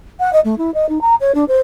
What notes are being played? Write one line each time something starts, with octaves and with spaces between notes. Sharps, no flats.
F#5
D#5
A3
E4
D#5
D#4
A#5
C#5
D4
C5